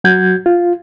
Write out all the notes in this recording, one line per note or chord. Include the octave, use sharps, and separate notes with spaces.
F#3 F#4 G6 G#6
F4